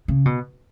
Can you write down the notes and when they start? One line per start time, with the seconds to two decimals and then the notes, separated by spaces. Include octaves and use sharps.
0.08 C#3
0.25 B2